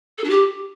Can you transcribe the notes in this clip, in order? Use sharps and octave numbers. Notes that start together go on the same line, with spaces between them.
A4
D4
G4